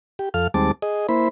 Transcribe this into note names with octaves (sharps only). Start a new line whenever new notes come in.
G4
F2 A4 F5 F6
D#2 G3 G#3 C4 A5 D6
G#4 D#5
A#3 E4 C5 B5